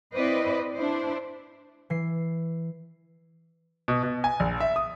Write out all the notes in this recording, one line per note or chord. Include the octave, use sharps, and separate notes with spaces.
C4 E4 B4 C5 D5 D#5
D4 E4 C5
E3 C7
B2
B2
G#5
A#1
E5
D#6